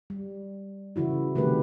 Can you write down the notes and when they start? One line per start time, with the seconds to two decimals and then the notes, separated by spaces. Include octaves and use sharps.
0.10 G3
0.96 C#3 E3 E4 F#4
1.35 C3 D#3 G3 A3 G4 B4